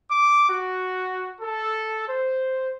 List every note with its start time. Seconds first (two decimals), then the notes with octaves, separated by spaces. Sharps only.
0.10 D6
0.50 F#4
1.41 A4
2.09 C5